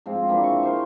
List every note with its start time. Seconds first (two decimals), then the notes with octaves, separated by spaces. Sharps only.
0.06 G#2 F3 C4 F4
0.28 A#2 E3 A#3 D4
0.44 C#6
0.63 A#4 C5 A5